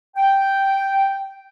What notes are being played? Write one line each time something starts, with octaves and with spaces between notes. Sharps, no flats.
G5